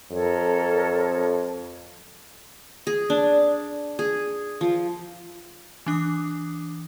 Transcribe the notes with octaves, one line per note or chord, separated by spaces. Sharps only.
F2 A4 A#4 C#5
G#4
D4
G#4
F3
E3 D4 D6 D#6